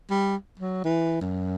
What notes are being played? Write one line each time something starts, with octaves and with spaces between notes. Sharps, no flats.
G3
F#3
E3
F#2